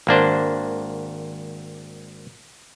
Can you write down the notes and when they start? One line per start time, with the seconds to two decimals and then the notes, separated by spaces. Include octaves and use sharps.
0.07 G#1 A#3 D4 C5